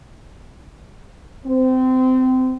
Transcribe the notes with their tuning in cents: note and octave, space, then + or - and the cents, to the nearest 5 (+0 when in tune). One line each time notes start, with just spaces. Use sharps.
C4 -25